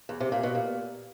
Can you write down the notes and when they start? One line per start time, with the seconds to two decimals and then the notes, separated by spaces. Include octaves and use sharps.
0.09 E2
0.20 C3
0.32 A#2
0.43 B2
0.55 A#2